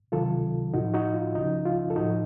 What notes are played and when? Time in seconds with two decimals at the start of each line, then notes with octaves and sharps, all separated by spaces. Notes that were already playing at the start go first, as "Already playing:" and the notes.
0.12 C#2 C3 D#3 F#3 F4 A4
0.74 A2 F3 D#4 F#4
0.94 D#4 F#4
1.14 F4
1.35 C#2 C#3 F3 D#4
1.65 F4
1.90 A4
1.96 A2 F3 D#4 F#4